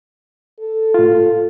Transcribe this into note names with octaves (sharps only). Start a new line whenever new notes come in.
A4
A2 F4